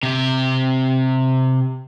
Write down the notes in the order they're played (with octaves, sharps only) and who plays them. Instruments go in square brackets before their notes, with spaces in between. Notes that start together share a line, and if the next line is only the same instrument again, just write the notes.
[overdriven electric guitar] C3 G4